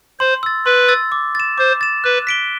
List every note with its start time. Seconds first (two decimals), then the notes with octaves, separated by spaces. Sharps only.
0.20 C5 C6
0.43 E6 A6
0.66 B4 C6
0.89 E6 A6
1.12 D6
1.35 A6 E7
1.58 C5 D6
1.81 A6 E7
2.04 B4 F#6
2.27 B6 D7 G7